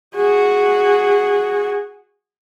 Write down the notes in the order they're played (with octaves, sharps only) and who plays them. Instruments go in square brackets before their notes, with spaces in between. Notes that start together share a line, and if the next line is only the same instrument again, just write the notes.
[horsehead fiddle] F#4 G#4